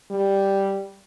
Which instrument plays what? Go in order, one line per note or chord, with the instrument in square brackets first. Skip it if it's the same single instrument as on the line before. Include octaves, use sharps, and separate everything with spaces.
[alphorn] G3